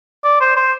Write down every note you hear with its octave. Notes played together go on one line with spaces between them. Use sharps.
D5
C5
C5